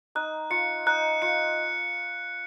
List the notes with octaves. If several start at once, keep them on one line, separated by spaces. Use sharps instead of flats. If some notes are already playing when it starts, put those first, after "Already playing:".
D#4 D#5 F#6
F4 F5 C#7
D#4 D#5 F#6
F4 F5 C#7